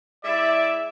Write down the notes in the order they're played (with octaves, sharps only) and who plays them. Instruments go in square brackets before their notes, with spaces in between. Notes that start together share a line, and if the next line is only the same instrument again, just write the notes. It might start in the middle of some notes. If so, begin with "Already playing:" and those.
[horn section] G#3 E4 E5 [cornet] D5